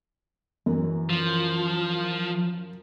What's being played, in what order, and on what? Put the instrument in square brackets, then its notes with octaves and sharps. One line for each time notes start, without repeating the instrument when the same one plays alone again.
[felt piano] F#2 [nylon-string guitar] E3 F#3
[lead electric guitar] F3